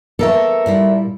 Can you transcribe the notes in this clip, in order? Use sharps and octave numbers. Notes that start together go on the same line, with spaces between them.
A#3 B3 A4 A#4 C#5 E5
A#2 G3 E4